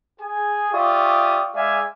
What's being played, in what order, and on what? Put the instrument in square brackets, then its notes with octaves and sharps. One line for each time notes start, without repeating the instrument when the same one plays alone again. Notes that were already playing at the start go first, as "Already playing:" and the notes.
[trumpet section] G#4 G#5
F4 G4 D5 E5 C#6 D#6
G#3 G#4 D5 E5 F5 G#5